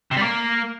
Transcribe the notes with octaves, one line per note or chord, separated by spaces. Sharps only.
C3
G3
A#3